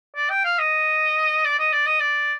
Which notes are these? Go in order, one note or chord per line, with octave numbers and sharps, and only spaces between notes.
D5
G5
F5
D#5
D5
D#5
D5
D#5
D5